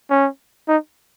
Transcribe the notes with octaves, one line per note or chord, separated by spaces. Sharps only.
C#4
D#4